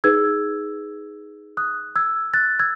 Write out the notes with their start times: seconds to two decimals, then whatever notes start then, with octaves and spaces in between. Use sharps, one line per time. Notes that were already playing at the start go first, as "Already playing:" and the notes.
0.04 D#4 G#4 B4 E6 G#6
1.57 D#6 F#6
1.96 E6 G#6
2.34 F#6 A6
2.59 E6 G#6